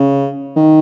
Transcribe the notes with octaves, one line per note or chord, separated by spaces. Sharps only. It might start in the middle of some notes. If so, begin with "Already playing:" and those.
Already playing: C#3
D#3